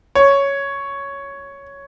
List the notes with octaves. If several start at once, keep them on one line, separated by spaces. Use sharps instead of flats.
C#5